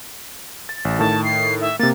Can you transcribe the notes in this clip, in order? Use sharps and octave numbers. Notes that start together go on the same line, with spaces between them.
A6
A1
A2 D#3 A5
C7
E5
C3 A#3 A6